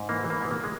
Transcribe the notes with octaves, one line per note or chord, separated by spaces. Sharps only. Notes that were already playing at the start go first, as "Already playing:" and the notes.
Already playing: G#2
E3 A#3
E3
A#3
G#2 B3
A#3
G#3